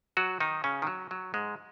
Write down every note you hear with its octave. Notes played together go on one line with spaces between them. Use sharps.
F#3 F#4
D#3 D#4
C#3 C#4
D#3
F#3
F#3
G#2 G#3